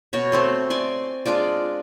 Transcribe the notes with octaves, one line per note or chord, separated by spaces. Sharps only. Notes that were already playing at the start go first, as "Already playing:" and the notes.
B2 F#4 C#5
A3 C4 C6
D5 G#5 C6
G#3 D4 F4 D5